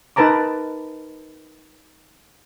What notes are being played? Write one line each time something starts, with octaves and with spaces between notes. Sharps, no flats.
D#4 A#4 B4 A5 A#5 D6